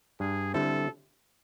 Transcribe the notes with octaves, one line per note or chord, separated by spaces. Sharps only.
G2 G#4
D3 G3 C4 E4 A4